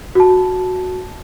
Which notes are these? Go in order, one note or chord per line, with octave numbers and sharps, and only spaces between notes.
F#4 A5